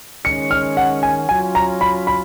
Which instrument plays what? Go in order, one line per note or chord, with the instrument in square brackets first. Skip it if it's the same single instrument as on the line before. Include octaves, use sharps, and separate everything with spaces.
[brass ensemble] D#3 G#3 C#4 [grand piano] C#7
[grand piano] F6
F#5
G#5
[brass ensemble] F#3 C#4 F4 [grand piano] G#5
[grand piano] A#5
B5
B5